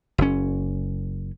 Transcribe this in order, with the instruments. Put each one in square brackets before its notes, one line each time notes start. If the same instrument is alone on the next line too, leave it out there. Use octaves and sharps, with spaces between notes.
[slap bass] F#1 C#4